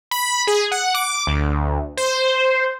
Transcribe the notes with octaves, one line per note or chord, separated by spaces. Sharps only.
B5
G#4
F#5
D6
D2
C5